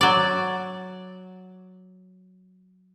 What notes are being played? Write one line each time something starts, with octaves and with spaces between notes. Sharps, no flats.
F#3 D5